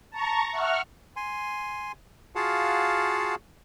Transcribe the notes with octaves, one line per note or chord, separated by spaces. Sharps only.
A5 A#5 C#6
E5 F#5 C#6 F6
G#5 C6
F4 F#4 G#4 F5 F#5 A5